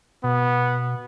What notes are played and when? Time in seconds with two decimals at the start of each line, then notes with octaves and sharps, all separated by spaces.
0.24 B2 B3